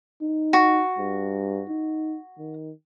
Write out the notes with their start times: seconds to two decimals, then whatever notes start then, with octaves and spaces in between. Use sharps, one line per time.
0.22 D#4
0.53 F#4
0.99 G2
1.69 D#4
2.39 D#3